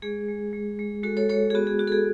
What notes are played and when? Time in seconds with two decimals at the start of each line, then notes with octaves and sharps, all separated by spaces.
0.02 G#3 G#4
0.28 G#3
0.53 G#3
0.79 G#3
1.03 G#3 F#4 A4
1.17 A4 C#5
1.29 G#3 A4 C#5
1.50 G#4
1.55 B3 F#4
1.67 G#4
1.79 F#4
1.88 A4
1.92 G#4